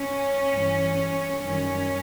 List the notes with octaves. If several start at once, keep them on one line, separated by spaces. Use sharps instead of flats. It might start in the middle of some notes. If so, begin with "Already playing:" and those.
Already playing: C#4
G2 E3 G3
F#2 D#3 G3 C#4